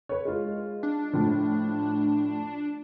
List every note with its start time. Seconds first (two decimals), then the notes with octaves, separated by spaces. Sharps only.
0.09 B4 C#5
0.25 G#3 F4
0.83 D4
1.13 A2 F3